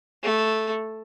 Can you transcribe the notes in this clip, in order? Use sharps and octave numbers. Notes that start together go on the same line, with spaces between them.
A3